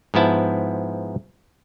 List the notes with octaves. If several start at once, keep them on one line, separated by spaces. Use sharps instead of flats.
G#2 F3 B3 E4 A5